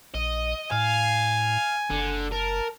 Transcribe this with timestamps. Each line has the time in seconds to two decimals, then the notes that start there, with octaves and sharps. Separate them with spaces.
0.14 A#1 D#5
0.71 A2 F5 G#5
1.90 F#1 D3
2.32 A#4 A5